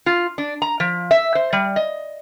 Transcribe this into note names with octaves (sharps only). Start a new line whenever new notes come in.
F4
D4
A#5
F3
E5
C5
G3
D#5